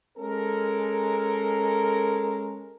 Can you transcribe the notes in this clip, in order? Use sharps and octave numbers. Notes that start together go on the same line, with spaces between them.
G#3 C#4 A4 A#4